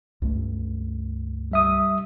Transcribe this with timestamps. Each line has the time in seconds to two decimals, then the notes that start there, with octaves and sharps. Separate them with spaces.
0.22 C#2 G2 A3
1.52 G3 E5 D#6